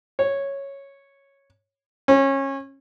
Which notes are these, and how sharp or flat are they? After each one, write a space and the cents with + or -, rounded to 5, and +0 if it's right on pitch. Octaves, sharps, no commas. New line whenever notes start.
C#5 -5
C#4 -25